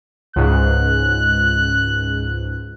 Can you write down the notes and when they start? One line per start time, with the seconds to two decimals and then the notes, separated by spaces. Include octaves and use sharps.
0.36 C#2 G#2 F#6